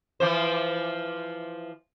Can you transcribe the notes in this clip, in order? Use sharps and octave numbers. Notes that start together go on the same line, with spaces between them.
E3 F3 C5